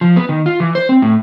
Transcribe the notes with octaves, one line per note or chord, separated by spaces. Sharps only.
F3
B3
D#3
F4
E3
C5
C4
A2